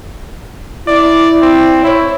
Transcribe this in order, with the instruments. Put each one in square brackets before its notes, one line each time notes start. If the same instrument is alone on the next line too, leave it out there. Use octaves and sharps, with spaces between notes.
[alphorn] E4 [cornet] D5
[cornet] C4
[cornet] E4 [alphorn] C#5